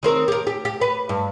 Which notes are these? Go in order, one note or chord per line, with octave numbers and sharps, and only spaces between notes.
D#3 C4 A#4
G4 A#4
G4
G4
B4
G2